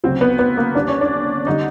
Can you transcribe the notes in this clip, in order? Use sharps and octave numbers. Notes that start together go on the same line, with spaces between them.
D2 C#3 F#3 C4
B3
B3
A#3
D2 D3 G3 D4
C#4
D4
D3 G3 D#4